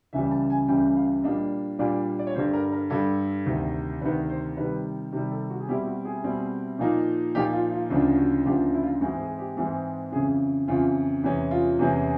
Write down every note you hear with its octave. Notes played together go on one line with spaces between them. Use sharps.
C#2 C#3 E3 G3 E5
A5
G#5
C#2 C#3 E3 G3 G5
F5
A#2 G3 A#3 D4 D#5
A#2 G3 A#3 D4 D5
D5
C#5
G2 D3 G3 C5
A#4
A#4
G2 D3 G3 A4
D2 C3 D#3
D2 C3 D#3 B4
C5
C3 D#3 G3 B4
C3 D#3 G3
A4
F#4
G#4
B2 G3 C4 E4 G4
F#4
G#4
B2 G3 C4 E4
A#2 F3 A#3 D#4
A#2 F3 A#3 D#4 G4
F4
F4
D2 C#3 F3 A#3 D4
F#4
D2 C#3 F3 A#3 D4 G4
E4
F4
G#2 E3 G#3 C4 F#4
G#4
G4
G#2 E3 G#3 C4
F2 C#3 E3 G#4
F2 C#3 E3 F4
E2 C3 E3 G#3 C#4 E4
F4
E2 C3 E3 G#3 C#4